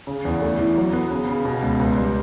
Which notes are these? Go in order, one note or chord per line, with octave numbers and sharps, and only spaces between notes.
C#3
E2
A3
E3
F#3
B3
C#3
C#3
B2
C#2
C#2
G3